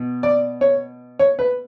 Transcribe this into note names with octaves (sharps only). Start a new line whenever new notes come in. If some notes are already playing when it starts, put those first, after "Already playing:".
Already playing: B2
D5
C#5
C#5
B4